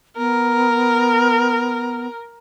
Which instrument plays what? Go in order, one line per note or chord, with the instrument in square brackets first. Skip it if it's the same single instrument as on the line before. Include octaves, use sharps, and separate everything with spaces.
[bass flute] B3 [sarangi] A#4